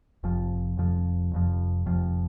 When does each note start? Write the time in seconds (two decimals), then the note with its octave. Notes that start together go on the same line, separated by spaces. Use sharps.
0.23 F1 F2 F3
0.77 F1 F2 F3
1.32 F1 F2 F3
1.86 F1 F2 F3